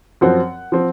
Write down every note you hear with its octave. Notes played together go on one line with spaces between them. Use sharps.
F#2 F3 C4 F#5
F3 C4